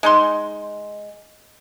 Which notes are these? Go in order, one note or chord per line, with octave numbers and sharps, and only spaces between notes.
G#3 D#4 C6